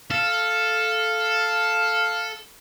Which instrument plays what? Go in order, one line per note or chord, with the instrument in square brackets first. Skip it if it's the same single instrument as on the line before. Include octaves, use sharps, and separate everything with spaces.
[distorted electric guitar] A4 [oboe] F5